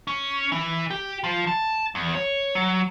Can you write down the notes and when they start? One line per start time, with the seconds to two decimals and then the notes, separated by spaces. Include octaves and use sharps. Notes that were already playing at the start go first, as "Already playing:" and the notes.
0.07 C#4
0.52 E3
0.90 G4
1.24 F3
1.47 A5
1.95 E2
2.15 C#5
2.55 F#3